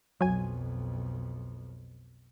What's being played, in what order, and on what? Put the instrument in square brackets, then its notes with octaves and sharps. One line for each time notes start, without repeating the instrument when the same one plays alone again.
[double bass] B1 F2 [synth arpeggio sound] F#3 G#5